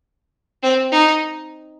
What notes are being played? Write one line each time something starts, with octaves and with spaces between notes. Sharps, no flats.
C4
D#4